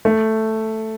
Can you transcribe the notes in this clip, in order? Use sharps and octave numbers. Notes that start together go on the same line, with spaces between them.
A3